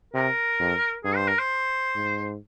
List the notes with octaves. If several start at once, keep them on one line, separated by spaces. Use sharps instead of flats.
C3 A#4
F2
G2 G#4
C5
A#4
C5
G#2